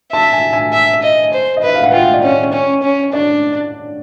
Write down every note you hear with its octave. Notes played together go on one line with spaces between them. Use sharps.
E5 A5
G#5
G#5
E5
D#5
C5
D#5
B4 E5
F5
F#5
F4 G5
D5
C#4
C#5
C#4
C#4
D4 D5